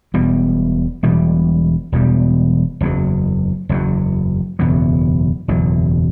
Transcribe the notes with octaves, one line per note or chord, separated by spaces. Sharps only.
E1 E2 B2 G3
E1 E2 B2 G3
E1 E2 B2 G3
F#1 E2 B2 F#3
F#1 E2 B2 F#3
F#1 E2 B2 F#3
F#1 E2 B2 F#3